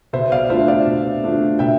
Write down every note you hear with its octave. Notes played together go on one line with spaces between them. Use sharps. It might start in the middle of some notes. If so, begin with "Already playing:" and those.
B2 C5 E5
D5 F5
A3 D4 F4 C5 E5
D5 F5
B2
A3 D4 F4
B2 E5 G5